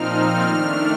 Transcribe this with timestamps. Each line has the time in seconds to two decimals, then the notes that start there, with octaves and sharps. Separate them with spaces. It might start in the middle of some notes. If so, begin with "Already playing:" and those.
Already playing: A#2 F3 C4 D#4 F6
0.42 D#3 A3 D4 F6